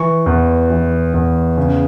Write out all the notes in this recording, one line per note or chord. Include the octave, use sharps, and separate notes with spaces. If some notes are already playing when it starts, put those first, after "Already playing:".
Already playing: E3 C#6
E2
E3
E2
C#3